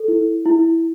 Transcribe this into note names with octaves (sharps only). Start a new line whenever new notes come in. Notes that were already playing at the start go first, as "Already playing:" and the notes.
Already playing: A4
E4
E4